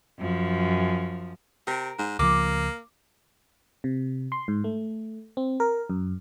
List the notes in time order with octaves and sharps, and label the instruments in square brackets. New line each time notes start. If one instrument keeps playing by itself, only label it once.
[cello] F#2 F3
[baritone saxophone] C3 [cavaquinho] A#4
[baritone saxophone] G#2
[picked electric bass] C#2 F3 [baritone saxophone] A#3 [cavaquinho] D6
[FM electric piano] C3
C6
G#2
A3
C4
A#4
F#2